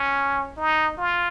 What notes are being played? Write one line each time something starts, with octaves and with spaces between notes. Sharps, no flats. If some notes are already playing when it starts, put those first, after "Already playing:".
Already playing: C#4
D#4
F4